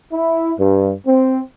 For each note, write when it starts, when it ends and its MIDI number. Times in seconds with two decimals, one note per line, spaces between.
0.11 0.51 64
0.57 0.92 43
1.06 1.41 60